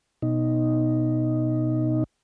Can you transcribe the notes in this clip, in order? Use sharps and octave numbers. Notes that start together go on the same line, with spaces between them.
B2 D#4